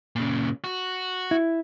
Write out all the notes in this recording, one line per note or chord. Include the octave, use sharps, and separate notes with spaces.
A#2 C#3
F#4
E4